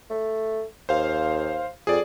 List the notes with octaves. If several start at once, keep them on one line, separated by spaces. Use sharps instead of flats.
A3
D#2 C5 F5
F2 G#4 D5